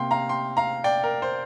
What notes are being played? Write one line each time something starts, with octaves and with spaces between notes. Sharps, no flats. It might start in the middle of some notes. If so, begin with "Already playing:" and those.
Already playing: C3 A#3 F5 G5 C6
F5 A#5
G5 C6
F5 A#5
D5 G5
A#4
C5